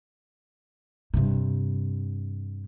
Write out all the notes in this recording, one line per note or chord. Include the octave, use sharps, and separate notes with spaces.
G2 C3